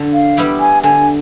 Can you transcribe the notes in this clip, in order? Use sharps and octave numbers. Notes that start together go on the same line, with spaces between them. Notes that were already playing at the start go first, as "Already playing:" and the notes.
Already playing: D3
F5
G3 B3 E4 G4
G#5
D3 G#5